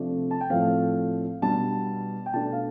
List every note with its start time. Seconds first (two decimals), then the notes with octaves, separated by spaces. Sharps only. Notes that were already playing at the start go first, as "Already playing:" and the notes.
Already playing: C3 F3 A3 D4 D5
0.31 A5
0.41 G5
0.50 A2 F3 A3 C4 F5
1.42 B2 G3 B3 D4 A5
2.26 G5
2.33 B2 A3 D4 A5
2.52 F5